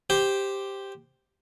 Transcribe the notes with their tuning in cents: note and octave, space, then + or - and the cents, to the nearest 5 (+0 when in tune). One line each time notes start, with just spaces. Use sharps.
G4 +0 C5 +0